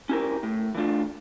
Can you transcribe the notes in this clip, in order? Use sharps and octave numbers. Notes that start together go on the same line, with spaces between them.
C#4 E4 G4 A#4
A2
E3 A3 D4 F4